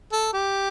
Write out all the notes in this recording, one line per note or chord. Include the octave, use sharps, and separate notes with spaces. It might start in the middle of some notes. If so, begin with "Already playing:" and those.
A4
G4